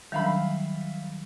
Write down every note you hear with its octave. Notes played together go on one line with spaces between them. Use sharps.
D#3 F#3 G3 E5 F5 B5